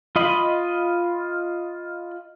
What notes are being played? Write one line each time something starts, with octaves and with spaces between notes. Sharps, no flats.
F4 D#5 B5